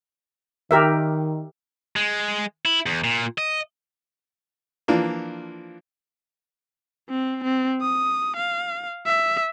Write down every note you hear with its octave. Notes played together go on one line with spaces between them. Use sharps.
D#3 G4 A#4 E5
G#3
E4
E2
A#2
D#5
E3 F3 A#3 D4
C4
C4
D#6
F5
E5